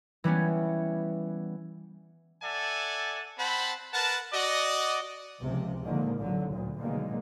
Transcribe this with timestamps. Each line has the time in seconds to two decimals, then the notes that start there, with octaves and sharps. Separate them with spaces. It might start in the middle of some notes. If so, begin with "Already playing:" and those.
0.24 E3 G3 B3 C#4
2.43 A4 D5 E5 F#5 G#5 A5
3.38 C4 C5 F#5 A5 B5
3.93 A#4 B4 F#5 A5
4.33 F#4 D5 D#5
5.41 C#2 C3 F3
5.84 A#2 D3 D#3 F3 G#3 A#3
6.17 A1 D3 F#3
6.50 D2 A#2
6.80 B2 D3 D#3 F#3 G#3 A#3